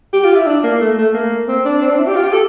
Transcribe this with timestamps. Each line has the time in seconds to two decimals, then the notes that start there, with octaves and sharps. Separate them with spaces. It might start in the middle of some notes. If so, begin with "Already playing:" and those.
0.13 G4
0.24 F4
0.36 E4
0.47 D4
0.64 A#3
0.81 A3
0.98 A3
1.14 A#3
1.48 C4
1.65 D4
1.82 C4
1.91 D4
1.99 E4
2.07 G4
2.16 F4
2.24 G4
2.33 A4